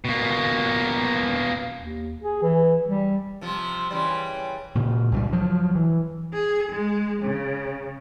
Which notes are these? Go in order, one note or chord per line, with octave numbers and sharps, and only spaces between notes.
B2 A#3
D#2
G#4
E3
G3
C3 F3
C#3 E3 G3
A#2 C#3
C#2 G2 F3 G3
F3 F#3
E3
G#4
G#3
C#3